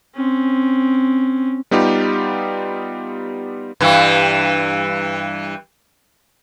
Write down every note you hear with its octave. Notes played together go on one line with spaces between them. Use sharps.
C4 C#4
G3 B3 D#4 F4 G4
G2 E3